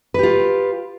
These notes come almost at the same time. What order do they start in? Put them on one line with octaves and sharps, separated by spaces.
B4 G4 F4